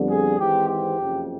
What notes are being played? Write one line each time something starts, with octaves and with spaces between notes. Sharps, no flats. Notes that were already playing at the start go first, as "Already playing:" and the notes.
Already playing: F2 D3 G3 B3
G#4
G#1 G#2 E3 G#3 C4 G4
G4
F#1 F2 C#3